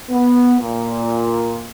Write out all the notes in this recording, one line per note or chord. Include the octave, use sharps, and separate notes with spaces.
B3
A#2